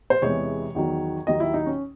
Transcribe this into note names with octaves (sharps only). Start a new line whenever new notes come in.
C5
E2 C3 E3 G#3 C#5
E2 D#3 F#3
D#2 D#3 F#3 D#5
E4
D#4
C#4